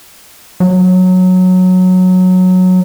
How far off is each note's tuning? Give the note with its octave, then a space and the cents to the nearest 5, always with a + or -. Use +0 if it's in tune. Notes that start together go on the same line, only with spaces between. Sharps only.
F#3 -10